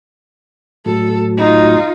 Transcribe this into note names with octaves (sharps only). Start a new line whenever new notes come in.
A2 F#3 A4
D#4 F4